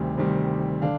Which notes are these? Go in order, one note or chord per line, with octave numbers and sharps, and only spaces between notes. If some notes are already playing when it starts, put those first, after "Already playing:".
Already playing: D2 C3 D#3 G3
D2 C3 D#3 G3
D3 D4 F5